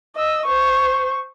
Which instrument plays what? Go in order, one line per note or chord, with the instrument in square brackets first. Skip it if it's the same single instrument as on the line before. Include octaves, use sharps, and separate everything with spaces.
[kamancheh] D#5 E6
C5 C#6